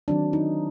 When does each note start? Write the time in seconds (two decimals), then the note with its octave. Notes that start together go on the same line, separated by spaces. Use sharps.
0.08 D#3 F#3 C4 D4
0.33 D#4